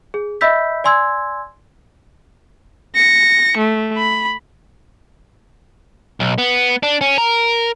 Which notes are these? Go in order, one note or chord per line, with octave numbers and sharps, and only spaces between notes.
G#4
D#5 E5 B5 E6 G6 B6
D5 G#5 C6 E6 G#6
A#6 C#7
A3
B5
B1
B3
D4
C#4
A#4